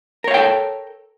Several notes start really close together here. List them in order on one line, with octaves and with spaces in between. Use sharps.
A#4 C#5 F5 G5 A4